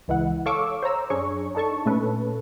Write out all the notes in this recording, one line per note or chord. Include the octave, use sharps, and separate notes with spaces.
C#2 E3 G#3 E4 F#5
A4 C#5 F5 C#6 D6 E6
C5 C#5 A#5 E6
F#2 D4 G#4 C#5 C#6
D4 D#4 A4 A5 C#6
A#2 A3 C#4 A4 B4